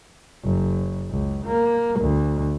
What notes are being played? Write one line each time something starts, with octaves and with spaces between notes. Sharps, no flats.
F#1
C#2
A#3
D2